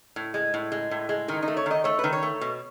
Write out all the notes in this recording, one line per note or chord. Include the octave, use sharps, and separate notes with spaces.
A2
G#3
A2
G#3
A2
G#3
D#3 D#4
D#4
A3
C#5
D#3 D#5
A3 C#5
B4
D#3
C#5
A3
B2